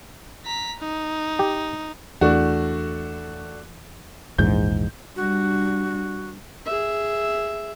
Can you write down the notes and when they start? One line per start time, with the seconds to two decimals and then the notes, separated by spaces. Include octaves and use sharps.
0.45 A#5 B6
0.80 D#4
1.39 G4
2.21 E2 A3 D4 F#4
4.38 A#1 E2 G#2 G6
5.16 G3 D4 F#4
6.66 G#4 E5